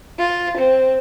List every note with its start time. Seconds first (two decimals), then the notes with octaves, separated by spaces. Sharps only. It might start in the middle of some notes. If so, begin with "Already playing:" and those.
0.18 F4
0.58 C4